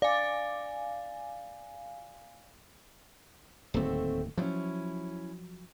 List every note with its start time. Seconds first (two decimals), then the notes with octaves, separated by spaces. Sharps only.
0.02 D5 F5 G#5
3.74 D1 D#2 A3 C4 F#4
4.38 F3 F#3 C#4 E4